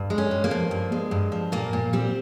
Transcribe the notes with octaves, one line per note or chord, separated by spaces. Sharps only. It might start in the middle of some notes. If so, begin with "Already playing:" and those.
Already playing: G2
G#3
C#4
G2
A#3
F3
G2
G#3
G2
F3
A#2 A#3
A#2
G3 C4